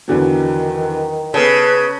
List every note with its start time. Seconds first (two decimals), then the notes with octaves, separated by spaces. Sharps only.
0.08 E2 D3 D#3 F#3
1.34 C#3 B3 A4 B4